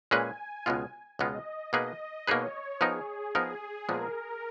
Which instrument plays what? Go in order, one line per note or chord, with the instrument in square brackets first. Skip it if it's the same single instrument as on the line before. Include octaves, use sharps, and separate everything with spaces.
[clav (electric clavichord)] A#2 G#3 C#4 G#4 B4 [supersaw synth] G#5
[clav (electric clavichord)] C#2 B2 G#3 B3 F4
[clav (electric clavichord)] C#2 B2 G#3 B3 F4 [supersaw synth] D#5
[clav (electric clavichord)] B2 A#3 D#4 G#4 B4
[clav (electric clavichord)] B2 A#3 D#4 G#4 B4 [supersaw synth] C#5
[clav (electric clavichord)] F3 B3 D#4 A#4 [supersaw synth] G#4
[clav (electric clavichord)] F3 B3 D#4 A#4
[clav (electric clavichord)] A#2 F3 G#3 B3 [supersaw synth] A#4